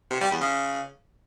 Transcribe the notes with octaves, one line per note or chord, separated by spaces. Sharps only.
C3
G3
E2
C#3